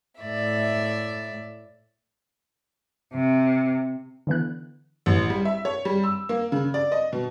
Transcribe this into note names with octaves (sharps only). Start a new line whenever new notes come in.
A2 D5 E5
C3
D3 E3 B3 F#6
A1
G3
E5
C#5
G3
E6
A#3
C#3
D5
D#5
B2